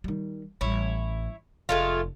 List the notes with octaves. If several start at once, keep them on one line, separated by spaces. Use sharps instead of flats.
D#3 G3
A1 G3 E4 C#5
F1 G#3 A3 F4